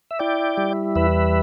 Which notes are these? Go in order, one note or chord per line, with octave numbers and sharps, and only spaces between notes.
E5
E4 D5 G5
G3
E2 B4 E5